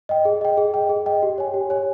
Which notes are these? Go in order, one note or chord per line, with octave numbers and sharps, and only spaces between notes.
D#5 G5
G#4
D#5 G5
G#4
D#5 G5
G#4
D#5 G5
G4
C#5 G#5
G4
C#5 G#5